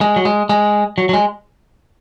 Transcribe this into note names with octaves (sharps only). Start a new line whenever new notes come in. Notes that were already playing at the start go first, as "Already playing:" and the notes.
G#3
F#3
G#3
G#3
F#3
F#3
G#3